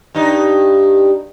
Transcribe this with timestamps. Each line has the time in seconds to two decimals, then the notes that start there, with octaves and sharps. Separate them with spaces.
0.15 G2 D#4